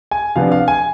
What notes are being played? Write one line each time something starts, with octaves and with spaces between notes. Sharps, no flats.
G#5
C3 F3 B3 D4 F5
F5
G#5